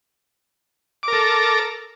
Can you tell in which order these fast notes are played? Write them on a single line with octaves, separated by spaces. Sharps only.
D6 A#4 A4